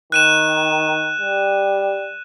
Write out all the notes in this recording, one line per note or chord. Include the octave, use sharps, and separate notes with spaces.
D#3 F#6 D#7 E7
G3